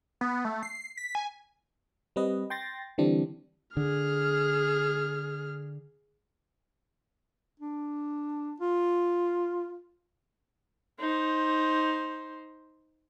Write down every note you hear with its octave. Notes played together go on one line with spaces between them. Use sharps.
B3
A3
C7
B6
G#5
G3 C4 B4 D#5
G5 C6 A6 A#6
D3 E3 G3 C4 D4
D3 G#4 F6
D4
F4
D#4 C5